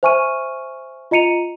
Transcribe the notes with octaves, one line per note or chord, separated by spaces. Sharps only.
C5 E5 G#5 C#6 F6 D#7
F4 D#5 A#5 C#7 D#7 F7